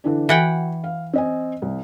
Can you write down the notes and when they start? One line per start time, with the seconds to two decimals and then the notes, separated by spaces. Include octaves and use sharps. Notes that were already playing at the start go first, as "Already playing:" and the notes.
0.04 D3 E3 D4
0.29 E3 F#4 F#5 G5
0.84 F5
1.13 C4 D#5 G#5
1.62 C2